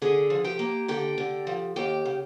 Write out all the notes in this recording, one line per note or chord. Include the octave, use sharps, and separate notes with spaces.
D3 G#4 G#5
F3
G4 G5
A#3
D3 G4 G5
D3
F3
D#2 G4 G5
C#3